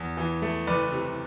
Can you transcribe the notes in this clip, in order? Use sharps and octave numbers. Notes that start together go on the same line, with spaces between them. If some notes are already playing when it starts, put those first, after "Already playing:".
Already playing: E2
E3
A3
F#1 B4 D5
C3